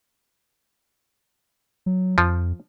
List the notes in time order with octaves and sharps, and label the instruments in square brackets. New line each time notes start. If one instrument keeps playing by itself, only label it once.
[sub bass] F#3
[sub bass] F2 [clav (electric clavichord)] F3